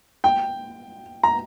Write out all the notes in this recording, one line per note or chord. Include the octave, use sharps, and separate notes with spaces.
G5
A#5